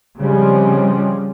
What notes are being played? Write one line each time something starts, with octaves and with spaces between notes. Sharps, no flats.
C#3 F3 G3 G#3 C4 C#4